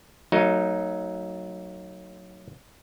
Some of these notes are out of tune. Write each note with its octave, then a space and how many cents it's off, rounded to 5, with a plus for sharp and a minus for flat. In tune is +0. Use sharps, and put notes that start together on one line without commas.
F#3 +0 A3 +45 D#4 +0